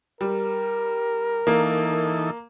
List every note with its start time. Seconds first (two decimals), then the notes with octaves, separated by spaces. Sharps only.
0.21 G3 A#4
1.47 E3 A#3 D#4 A4